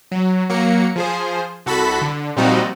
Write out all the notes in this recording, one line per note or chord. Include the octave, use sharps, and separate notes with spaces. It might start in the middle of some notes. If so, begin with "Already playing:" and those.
F#3
F#3 A#3 C#7
F3 G#4 C5
C2 F#4 A4 B5 B6
D3
A#2 F3 G3 C4 D#4 F#4